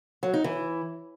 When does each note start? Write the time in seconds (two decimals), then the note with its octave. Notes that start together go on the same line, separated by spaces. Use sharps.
0.23 F#3
0.34 D#4
0.44 E3